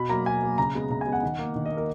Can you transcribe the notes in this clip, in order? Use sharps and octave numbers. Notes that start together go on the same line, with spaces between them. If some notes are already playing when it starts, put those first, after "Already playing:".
Already playing: B2 B5
F#3 A#3 A#5
B2 G#5
F#3 A#3
C#3 A#5
G#3 B3
C#3 A#5
G#5
G#3 B3
F#5
D#3
A#3
D#3
D#5
A#3
A#4